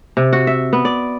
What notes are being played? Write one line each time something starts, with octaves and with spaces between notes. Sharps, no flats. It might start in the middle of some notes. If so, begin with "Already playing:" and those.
C3
F#4
E5
B3
D5